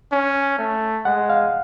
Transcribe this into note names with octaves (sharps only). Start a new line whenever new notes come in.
C#4
A3
G#3 F#5
F5